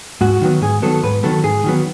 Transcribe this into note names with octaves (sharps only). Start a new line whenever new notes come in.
G#2 F#4
D#3 F#3 B3
G#2 G#4
D#3 F#3 B3 A4
G#2 B4
D#3 F#3 B3 A4
G#2 G#4
D#3 F#3 B3